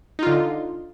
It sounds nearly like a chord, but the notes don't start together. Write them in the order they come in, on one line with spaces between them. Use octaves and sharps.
D#4 F4 D3